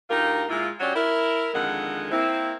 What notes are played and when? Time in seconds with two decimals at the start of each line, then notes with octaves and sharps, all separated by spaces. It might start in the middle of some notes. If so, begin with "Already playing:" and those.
0.10 D2 D#4 F4 G4 A#4
0.49 A#2 G#3 A#3 E4 F4
0.80 F#3 C#4 F#4 G4 C#5 D5
0.95 E4 A#4
1.54 F2 D3 D#3 G#3 A#4 F#5
2.11 A#3 C4 E4